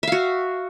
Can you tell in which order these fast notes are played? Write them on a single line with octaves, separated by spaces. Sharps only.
E5 F5 F#4